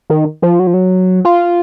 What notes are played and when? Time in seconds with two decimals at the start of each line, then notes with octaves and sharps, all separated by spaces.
0.10 D#3
0.42 F3
0.59 F#3
0.67 F3
0.74 F#3
1.25 F4